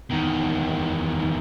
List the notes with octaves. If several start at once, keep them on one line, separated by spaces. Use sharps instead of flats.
E2 D#3